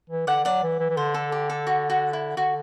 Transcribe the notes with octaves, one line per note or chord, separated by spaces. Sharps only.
E3
D3 D5 F#5
F#3 D5 F#5
E3
E3
E3
D3 C5
A4
G4
A4
F#4
F#4
E4
D3 F#4